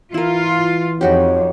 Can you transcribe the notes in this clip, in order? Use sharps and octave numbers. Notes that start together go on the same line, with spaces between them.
E3 E4 F4 A#4
F2 D#4 F#4 G4 C#5